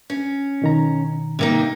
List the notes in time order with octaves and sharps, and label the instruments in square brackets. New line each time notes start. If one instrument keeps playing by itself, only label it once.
[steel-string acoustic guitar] C#4
[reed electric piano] B2 D#3 A#5
[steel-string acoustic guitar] C3 A#3 D#4